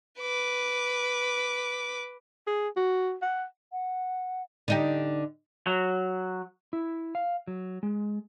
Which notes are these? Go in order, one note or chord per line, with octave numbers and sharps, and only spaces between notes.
B4 D6
G#4
F#4
F#5
F#5
D3 D#4 G4
F#3
E4
F5
F#3
G#3